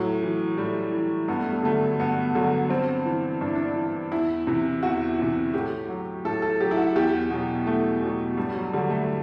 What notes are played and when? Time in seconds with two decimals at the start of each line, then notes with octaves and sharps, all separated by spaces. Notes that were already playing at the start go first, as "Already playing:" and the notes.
Already playing: A2 F#3
0.22 E3
0.57 A2 G3
0.92 E3
1.28 G2 B3
1.40 A3
1.52 G3
1.63 D3 F#3 A3
2.00 G2 B3
2.35 D3 F#3
2.69 G2 C4
3.06 E3
3.41 G2 D4
3.47 E4
3.55 D4
3.76 E3
4.11 E2 E4
4.47 C3 E3
4.83 E2 F#4
5.19 C3 E3
5.54 A2 G4
5.89 F#3
6.25 A2 A4
6.42 A4
6.60 F#3 G4
6.71 E4
6.77 F#4
6.95 E2 G4
7.30 B2 F#3
7.66 E2 A3
8.02 B2 F#3
8.37 G2 G3
8.55 F#3
8.73 D3 F#3 G3
8.90 A3